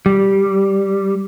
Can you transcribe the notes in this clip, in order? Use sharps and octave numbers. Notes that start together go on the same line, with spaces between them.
G3